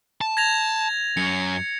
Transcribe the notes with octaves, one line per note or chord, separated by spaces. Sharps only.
A5
G#6 A#6 F7
F#2 C#7